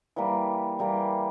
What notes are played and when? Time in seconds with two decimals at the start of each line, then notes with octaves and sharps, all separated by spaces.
0.16 E3 G3 A#3
0.79 E3 G3 A#3